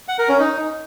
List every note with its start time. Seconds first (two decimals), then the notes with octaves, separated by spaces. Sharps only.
0.08 F#5
0.19 A#4
0.29 C#4
0.39 D#4